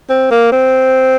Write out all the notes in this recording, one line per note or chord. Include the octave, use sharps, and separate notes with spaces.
C4
A#3
C4